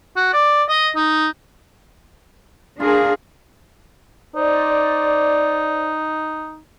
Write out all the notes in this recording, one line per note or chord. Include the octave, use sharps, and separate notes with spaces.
F#4
D5
D#5
D#4
D4 F4 G#4 A#4
D#4 C5 D5